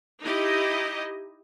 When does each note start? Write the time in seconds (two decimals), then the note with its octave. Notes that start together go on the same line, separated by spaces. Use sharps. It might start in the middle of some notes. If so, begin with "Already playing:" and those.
0.23 D#4 E4 G4 D#5